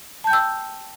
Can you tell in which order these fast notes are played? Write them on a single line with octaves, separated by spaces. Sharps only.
A5 G6 G5 E6